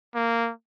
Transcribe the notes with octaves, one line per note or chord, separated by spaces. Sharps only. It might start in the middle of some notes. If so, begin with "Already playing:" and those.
A#3